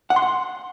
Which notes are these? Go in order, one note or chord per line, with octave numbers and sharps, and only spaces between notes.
F#5
C6
F#5